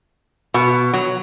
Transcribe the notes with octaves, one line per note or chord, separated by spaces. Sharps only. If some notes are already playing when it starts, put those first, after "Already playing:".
B2
F#3